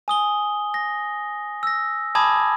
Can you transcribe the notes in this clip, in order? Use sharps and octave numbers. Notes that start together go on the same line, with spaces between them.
G#5 D#6 G7
A#6
E6 A#6
G#5 A5 B5 D6 D#6 G#6